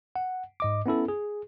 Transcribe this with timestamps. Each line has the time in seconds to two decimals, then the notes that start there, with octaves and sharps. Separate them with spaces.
0.16 F#5
0.60 G#2 D#5 D6
0.86 B3 C#4 E4 A4
1.08 G#4